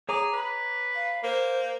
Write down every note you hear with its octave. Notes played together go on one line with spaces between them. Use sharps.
G#4 C#5 A#5 D6
B4
F5
A#3 C5